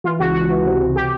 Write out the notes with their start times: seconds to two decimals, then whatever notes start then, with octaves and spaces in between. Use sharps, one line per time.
0.04 E3 F4
0.19 C#2 F#4
0.34 C#2 F#4
0.49 E3
0.65 C3
0.80 C3
0.96 G4